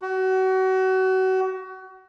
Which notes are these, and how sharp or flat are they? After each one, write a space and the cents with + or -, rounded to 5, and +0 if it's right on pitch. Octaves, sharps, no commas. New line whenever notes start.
F#4 +30